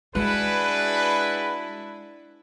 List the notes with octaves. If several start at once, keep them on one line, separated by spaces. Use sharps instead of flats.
G#3 D4 E4 F#4 G#4 B4